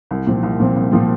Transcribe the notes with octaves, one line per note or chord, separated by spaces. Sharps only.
C2
A#2 F3 C4
C2
A#2 F3 C4
C2
A#2 F3 C4